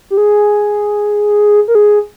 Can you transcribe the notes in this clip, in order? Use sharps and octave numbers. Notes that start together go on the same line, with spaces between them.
G4
G#4
A#4
G#4